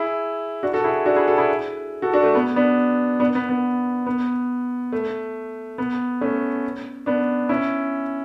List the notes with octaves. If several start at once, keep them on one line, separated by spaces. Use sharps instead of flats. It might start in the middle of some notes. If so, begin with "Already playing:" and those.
Already playing: E4 G#4
D4 F#4
F#4 A4
E4 G#4
D4 F#4
E4 G#4
F#4 A4
E4 G#4
F#4 A4
D4 F#4
A3
B3
B3 D4
B3 D4
B3
B3
B3
A3
B3
A3 C#4
B3 D4
C#4 E4